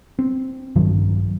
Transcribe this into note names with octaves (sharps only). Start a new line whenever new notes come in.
C4
A#1 G2 D#3 F#3